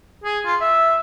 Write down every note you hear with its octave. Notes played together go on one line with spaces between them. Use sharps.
G#4
F4
E5